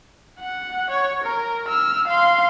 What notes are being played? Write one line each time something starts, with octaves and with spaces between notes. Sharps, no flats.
F#5
C#5
A#4
E6 F6
F5 C6